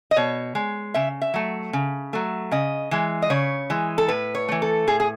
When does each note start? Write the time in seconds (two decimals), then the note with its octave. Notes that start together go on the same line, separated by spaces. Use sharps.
0.11 D#5
0.16 B2 C#5
0.55 G#3
0.94 C#3 E5
1.22 E5
1.34 F#3 A3
1.73 C#3
2.13 F#3 A3
2.51 C#3 D#5
2.91 E3 G#3
3.22 D#5
3.30 C#3 C#5
3.70 E3 G#3
3.98 A4
4.08 A2 B4
4.35 C#5
4.49 E3 A3
4.62 A4
4.87 A2 G#4
5.00 G#4